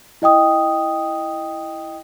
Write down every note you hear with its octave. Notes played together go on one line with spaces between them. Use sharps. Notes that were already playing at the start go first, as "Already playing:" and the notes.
E4 D#5 G5 D#6